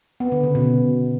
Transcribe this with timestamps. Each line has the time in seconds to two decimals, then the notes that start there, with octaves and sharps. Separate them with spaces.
0.20 B3
0.32 D3
0.43 C#3
0.55 B2